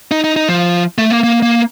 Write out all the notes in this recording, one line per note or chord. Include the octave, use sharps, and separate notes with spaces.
D#4
D#4
D#4
F3
A3
A#3
A#3
A#3